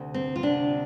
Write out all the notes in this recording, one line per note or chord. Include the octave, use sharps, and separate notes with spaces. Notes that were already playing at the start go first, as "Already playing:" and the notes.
Already playing: D2 C3
C4
F4
D2 C3 D4